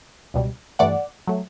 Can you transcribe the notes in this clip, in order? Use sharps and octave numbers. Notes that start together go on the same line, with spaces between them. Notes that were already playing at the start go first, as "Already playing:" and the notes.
C#2 B2 G3
G2 E3 A3 D5 F#5
F#3 A3